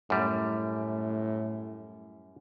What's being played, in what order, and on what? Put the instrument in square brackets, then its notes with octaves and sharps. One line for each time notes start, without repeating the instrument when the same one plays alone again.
[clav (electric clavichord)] F#2 G3 [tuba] A2